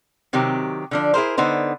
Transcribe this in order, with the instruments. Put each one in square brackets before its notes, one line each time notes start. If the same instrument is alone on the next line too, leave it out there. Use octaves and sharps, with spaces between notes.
[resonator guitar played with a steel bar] C3 D#3 F#3 C4 G4
D3 F3 D4
E4 G#4 A#4 C5
D3 B3 D#4 C5